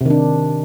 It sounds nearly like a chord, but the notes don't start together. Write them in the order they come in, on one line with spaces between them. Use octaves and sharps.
C3 D#3 D4